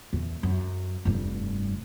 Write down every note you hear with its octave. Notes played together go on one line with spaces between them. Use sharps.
E2
F#2
F1 G2